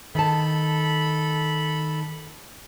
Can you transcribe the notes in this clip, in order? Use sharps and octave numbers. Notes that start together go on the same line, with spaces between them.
D#3 A4 A5 B5